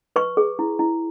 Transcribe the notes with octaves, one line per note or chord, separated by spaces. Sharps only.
B4 C#6
G#4
E4
E4